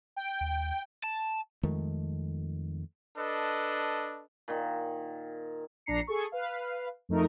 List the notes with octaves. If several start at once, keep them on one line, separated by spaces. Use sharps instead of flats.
G5
D#2
A5
F2 D#3 G#3 A3
D4 A4 B4 D#5
A#2 D#3
A#1 D4 A#5 C7 C#7
G#4 A4 C#6
B4 F5
F2 A3 D#4 A#4